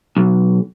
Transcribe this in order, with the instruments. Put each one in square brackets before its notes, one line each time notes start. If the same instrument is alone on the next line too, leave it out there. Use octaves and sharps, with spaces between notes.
[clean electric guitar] B1